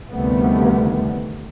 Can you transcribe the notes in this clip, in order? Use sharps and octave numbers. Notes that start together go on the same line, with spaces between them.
D2 C3 D#3 G3 A3 B3